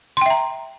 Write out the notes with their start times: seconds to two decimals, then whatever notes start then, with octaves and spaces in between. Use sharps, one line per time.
0.17 C6
0.21 G5
0.26 E5
0.30 A#5